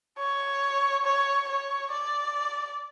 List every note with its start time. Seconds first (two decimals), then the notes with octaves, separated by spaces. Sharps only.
0.18 C#5
1.04 C#5
1.49 C#5
1.92 D5